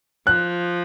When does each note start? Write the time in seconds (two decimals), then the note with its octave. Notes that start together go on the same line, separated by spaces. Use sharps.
0.26 F3 F#6